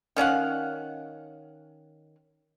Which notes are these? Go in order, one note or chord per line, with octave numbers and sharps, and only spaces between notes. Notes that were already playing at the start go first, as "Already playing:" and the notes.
D#3 C#4 F5 F#5